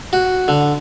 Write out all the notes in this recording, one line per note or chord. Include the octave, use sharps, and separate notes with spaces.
F#4
D3